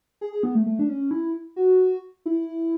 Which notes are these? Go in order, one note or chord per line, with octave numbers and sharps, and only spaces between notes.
G#4
G#4
B3
A3
A3
D4
C#4
E4
F#4
E4